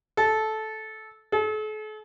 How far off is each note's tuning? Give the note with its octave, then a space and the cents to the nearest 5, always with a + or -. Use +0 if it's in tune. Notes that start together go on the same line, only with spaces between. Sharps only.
A4 -15
A4 -45